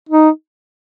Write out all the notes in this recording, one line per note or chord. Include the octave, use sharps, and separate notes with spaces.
D#4